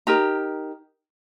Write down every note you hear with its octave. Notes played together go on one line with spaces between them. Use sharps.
D#4 G4 A#4 A#5